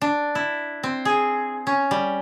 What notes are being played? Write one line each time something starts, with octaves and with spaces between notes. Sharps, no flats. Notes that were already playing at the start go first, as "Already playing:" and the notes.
D4
E4
C4
G#4
C#4
G3